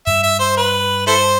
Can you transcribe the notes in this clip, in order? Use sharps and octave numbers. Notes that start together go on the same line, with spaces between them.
G2 E5
E5
C5
B4
E4 A4 C5